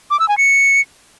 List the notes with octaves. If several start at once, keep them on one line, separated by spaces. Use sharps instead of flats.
D6
E6
G#5
C#7